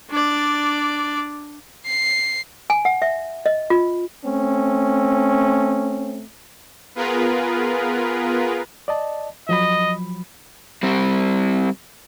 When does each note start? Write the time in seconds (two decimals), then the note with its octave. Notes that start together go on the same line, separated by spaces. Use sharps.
0.10 D4 D5
1.86 C7
2.70 G#5
2.85 F#5
3.02 E5
3.46 D#5
3.70 F4
4.24 A3 C4 C#4
6.95 B3 F4 G#4 A#4 B4
8.88 D5 D#5 A5
9.49 F3 F#3 D#5 B5
10.83 G3 C4